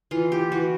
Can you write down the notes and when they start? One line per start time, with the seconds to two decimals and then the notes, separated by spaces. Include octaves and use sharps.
0.11 E3 F4
0.32 G4
0.52 E3 F#4